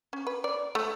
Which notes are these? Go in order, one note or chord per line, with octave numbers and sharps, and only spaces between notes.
C#4
B4
D5
A3